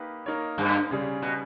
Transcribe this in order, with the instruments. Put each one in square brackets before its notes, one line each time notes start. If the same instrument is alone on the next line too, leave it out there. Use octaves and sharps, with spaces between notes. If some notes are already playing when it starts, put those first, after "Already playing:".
Already playing: [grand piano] A#3 D#4 G4 B4
A#3 D#4 A#4 C#5
[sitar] G2
[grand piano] C#3 G3 C#4 G#4
[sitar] B2